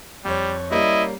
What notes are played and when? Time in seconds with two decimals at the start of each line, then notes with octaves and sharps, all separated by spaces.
0.25 F2 G3 C#5
0.71 G3 A#3 C#4 E4 D#5